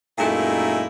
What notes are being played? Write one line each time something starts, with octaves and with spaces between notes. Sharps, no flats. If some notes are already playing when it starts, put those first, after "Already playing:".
F#2 A#2 G#3 A3 D#4 E4